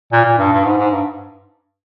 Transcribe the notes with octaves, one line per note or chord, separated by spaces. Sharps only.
A#2
A#2
G2
G2
G#2
G#2
G2